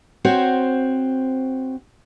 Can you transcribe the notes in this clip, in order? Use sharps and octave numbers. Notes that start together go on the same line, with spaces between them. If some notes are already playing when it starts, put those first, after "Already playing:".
C4 F#4 C5 C#5